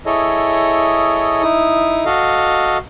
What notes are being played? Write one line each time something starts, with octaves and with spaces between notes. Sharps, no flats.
E4 G#4 A4 C#5 D#5
D#4 E4 D#6
F#4 A4 D#5 F5